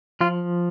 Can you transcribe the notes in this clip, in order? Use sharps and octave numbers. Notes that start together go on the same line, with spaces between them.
F3 F4